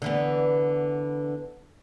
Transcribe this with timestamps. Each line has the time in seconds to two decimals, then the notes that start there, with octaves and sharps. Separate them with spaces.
0.02 D3 E3 B3